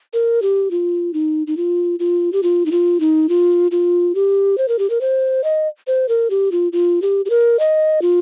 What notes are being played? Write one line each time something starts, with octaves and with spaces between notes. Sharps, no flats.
A#4
G4
F4
D#4
D#4
F4
F4
G4
F4
D#4
F4
D#4
F4
F4
G4
C5
A#4
G4
A#4
C5
D#5
C5
A#4
G4
F4
F4
G4
G4
A#4
D#5
F4